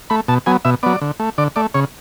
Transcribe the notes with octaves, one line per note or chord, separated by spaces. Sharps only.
A3 B5
B2 A5
F#3 B3 G#5
B2 E5
F#3 B3 D5
D3
A3
D3 D5
A3 D5
C#3 C#5